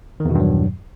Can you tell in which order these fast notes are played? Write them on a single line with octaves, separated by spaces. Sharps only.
D#3 E2 B2 G2 F#3